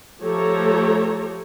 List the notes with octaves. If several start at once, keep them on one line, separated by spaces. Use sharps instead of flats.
F3 A3 G4 A4 C#5 A#5